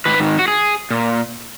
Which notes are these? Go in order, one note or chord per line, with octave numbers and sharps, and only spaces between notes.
G#2 D#3 B4
F#4
G#4
A#2